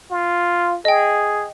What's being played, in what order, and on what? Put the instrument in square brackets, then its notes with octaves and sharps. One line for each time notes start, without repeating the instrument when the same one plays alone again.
[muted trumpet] F4
[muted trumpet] G#4 [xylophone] D#5 G5